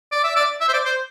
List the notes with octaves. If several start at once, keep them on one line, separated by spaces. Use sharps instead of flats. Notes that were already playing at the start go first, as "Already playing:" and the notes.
D5
E5
D5
E5
C5
D5
C5